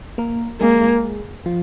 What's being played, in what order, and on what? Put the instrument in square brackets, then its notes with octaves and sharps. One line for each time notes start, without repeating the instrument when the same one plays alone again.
[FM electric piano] A#3 A#4
[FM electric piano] G#3 G#4 [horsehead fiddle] A#3
[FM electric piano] F3 F4